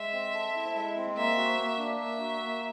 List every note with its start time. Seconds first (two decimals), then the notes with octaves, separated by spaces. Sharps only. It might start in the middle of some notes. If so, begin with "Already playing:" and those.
Already playing: G#3 E5
0.13 C4
0.34 A4
0.55 E4
0.75 G#3
0.96 C4
1.17 A#3 E5
1.37 F#4
1.58 A#3
1.78 D4
1.99 A#3 E5
2.20 F#4
2.40 A#3